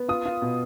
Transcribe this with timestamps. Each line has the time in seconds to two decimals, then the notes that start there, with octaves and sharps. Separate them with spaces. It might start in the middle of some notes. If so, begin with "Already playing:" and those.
Already playing: B3
0.08 F4 D#6
0.25 F4
0.42 B2